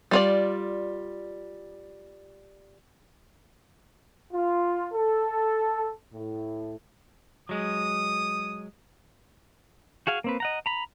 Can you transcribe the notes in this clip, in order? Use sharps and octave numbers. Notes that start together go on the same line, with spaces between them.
G3 F4 D5
F4
A4
A2
F#3 G#3 D#6
F#4 G#4 F5 G#5
A#3 C4 B4
D#5 F#5 A#5
A#5 B5